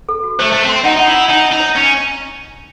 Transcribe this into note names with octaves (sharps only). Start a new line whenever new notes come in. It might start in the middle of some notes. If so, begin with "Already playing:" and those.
A4
F#4
A3 C5
A3 A5
C4
C6
D#4 F#5
D#4 F#5
E4
F#5
D#4 G#5
E4
D#4
C#5
C#4 D#5